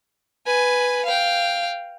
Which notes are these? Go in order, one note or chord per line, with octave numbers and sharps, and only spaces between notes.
B4 G#5
F5 G5